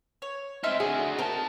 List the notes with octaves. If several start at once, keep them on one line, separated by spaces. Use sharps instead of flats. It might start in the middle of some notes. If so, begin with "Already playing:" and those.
C#5
C4 D#4 E5 C6 F6
D3 F#4 G#4
C4 D#4 A4 A#4 A5